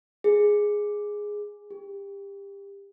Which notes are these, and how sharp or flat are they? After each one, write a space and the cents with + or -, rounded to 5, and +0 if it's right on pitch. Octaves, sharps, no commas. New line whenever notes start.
G#4 +0
G4 +25